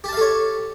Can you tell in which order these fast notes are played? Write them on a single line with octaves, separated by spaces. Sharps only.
G4 A5 F5 A4 C#5